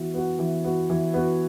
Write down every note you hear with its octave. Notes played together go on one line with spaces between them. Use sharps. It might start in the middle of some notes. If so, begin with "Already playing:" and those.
Already playing: E3 B3 F#4
B3 F#4
E3
B3 F#4
E3
B3 F#4